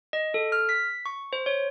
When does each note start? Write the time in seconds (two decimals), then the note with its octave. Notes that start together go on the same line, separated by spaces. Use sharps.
0.13 D#5
0.34 A4
0.52 F6
0.69 B6
1.06 C#6
1.33 C5
1.46 C#5